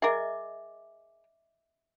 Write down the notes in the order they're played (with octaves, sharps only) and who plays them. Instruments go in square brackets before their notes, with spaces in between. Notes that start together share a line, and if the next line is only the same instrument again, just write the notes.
[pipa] G#4 A#4 [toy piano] D#5 E5 D6